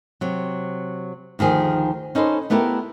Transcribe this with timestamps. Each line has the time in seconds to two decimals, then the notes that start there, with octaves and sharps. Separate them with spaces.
0.21 C3 F#3
1.39 D2 D#3 F3 G#4
2.15 C#4 D#4 A4 B4 C5
2.50 A3 B3 E4 G4 A#4